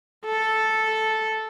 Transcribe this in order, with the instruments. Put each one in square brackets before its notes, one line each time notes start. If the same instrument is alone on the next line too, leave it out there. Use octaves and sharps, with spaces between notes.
[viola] A4